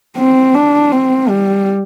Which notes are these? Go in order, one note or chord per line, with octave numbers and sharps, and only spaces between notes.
C4
D4
C4
G3